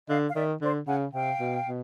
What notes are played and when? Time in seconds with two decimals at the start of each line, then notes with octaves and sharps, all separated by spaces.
0.09 D3 D#5 F5
0.29 F5
0.35 D#3 D5 E5
0.61 D3 C5 D5
0.87 C#3 F#5 G#5
1.13 C3 F5 G5
1.39 B2
1.66 B2